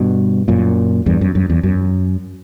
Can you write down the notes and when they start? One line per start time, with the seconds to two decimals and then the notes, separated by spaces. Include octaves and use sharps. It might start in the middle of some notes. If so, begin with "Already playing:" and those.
Already playing: G2 B2
0.48 F#2 A#2
1.06 E2 G2
1.21 F#2
1.35 F#2
1.50 E2
1.63 F#2